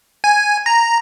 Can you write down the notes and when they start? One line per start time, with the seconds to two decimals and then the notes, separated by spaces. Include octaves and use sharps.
0.24 G#5
0.66 A#5